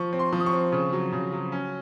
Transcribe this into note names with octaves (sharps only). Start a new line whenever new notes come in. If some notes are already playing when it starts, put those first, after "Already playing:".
Already playing: F3 C#6
C4
C6
F3
D#6
C#6
C4
C#3
F#3
C#3
F#3
C#4